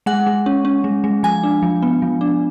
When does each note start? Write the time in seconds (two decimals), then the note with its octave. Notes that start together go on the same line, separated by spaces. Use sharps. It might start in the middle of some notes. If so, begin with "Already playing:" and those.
0.06 G#3 F#5
0.27 G#3
0.46 C#4
0.65 C#4
0.84 G#3
1.04 G#3
1.23 F3 G#5
1.43 D4
1.62 F3
1.82 B3
2.02 F3
2.21 D4